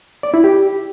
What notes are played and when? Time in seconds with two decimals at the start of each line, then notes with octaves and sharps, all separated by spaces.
0.23 D5
0.34 E4
0.44 G4